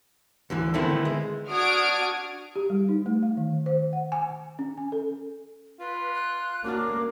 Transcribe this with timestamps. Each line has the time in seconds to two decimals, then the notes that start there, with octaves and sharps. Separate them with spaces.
0.50 D2 D3 E3
0.74 D3 D#3 A3 B3 C4 E4
1.05 G#3
1.47 D4 F#4 D#6 F6 G#6 D7
2.56 G4
2.70 G3
2.89 D#4
3.06 A3
3.23 F5
3.37 D#3
3.66 C5
3.93 F#5
4.12 G#5
4.59 C#4
4.78 G#5
4.92 A4
5.80 F4 B4
6.14 F#6
6.64 A#3 C#4 D4 F#4 D6 F6